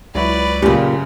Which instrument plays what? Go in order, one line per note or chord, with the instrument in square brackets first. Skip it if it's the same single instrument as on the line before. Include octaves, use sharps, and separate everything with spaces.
[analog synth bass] C#2 [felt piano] F#3 E4 F#4 [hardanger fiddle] B4 D5
[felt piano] F#2 C#3 [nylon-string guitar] A#2 G4